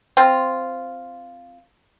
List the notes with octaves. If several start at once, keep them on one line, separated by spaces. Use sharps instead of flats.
C4 F4